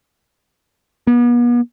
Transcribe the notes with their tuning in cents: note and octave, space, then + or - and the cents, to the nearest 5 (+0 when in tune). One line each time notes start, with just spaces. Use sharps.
B3 -40